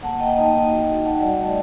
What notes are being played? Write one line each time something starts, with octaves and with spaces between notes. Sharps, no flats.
A#3 F#5 A5
A#3 D#5 G5
D#4 D#5 G5
D#4
F#4
F#4
F#4 F#5 A5
G3 D5 F#5
A3 D#5 G5